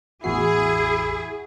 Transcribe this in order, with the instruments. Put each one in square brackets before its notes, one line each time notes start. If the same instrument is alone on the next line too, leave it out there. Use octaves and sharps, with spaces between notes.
[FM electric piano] A1 E2 C7 [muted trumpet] E4 [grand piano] F#4 [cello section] G#4